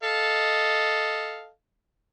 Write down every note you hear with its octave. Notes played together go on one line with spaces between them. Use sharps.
A4 D#5 F5